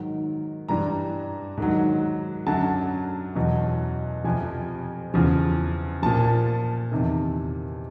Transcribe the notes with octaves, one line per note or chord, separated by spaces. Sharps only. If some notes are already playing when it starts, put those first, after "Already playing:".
Already playing: G#2 D#3 F#3
G2 E3 G3 A#5
G#2 D#3 F#3
F#2 D3 F#3 A5
E2 B2 F#3
F2 C3 F3 G#5
E2 C#3 F3
A#2 F3 A5
E2 C3 D#3